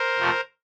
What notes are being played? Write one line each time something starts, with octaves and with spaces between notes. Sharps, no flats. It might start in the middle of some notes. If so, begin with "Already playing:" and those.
Already playing: A#4 C5
F2 C3 F3 A3